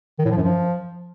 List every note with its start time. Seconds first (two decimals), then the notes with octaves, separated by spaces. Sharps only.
0.19 D#3
0.25 A2
0.31 F3
0.37 F#2
0.43 F3